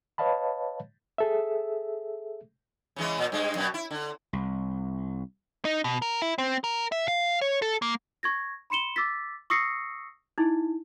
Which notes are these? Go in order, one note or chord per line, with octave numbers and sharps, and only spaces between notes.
B4 C#5 D#5 F5 A5 B5
G#4 A4 E5
C#3 E3 G#3
A#2
G2 G#3
F#2 B2
E4
D3
C2
D#4
B2
A#4
E4
C4
A#4
E5
F5
C#5
A4
A#3
C#6 G#6 A#6
B5 C6 C#7 E7 G7
D6 E6 A6 B6
C#6 D#6 E6 A#6 C7 C#7
D#4 E4